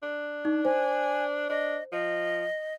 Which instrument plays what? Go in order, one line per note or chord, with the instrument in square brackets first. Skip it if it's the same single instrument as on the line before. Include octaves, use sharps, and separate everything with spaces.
[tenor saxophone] D4
[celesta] D#4
[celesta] C5 [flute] G#5
[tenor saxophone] D4 [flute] D#5
[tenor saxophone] F3 [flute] D#5